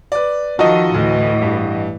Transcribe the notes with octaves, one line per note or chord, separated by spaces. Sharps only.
B4 D5
D#3 F3 D#4 F4 F#4 A4 D#5
D2 A2 E3
G2